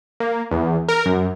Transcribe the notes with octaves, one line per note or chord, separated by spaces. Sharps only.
A#3
E2
A#4
F#2